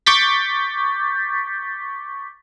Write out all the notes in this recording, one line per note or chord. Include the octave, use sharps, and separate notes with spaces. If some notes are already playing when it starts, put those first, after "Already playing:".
C#6 D6 G6 A6 B6